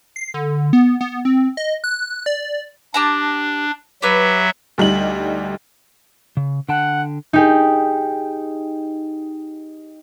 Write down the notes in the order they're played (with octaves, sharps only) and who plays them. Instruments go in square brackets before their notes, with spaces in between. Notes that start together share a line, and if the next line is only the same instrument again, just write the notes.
[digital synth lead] C7
D3
B3
B3
C4
D#5
F#6
D5
[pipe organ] D4 [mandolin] G4 A5 A#5
[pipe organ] F#3 E5 [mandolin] G4 B4
[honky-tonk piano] D2 G3 D#4 F#7
[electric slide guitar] C#3
[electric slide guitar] D3 G5 A5 [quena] F#5
[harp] D#4 G4 G#4